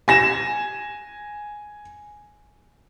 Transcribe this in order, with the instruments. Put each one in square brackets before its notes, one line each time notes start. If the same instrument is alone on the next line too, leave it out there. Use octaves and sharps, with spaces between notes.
[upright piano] G#5 A#6 E7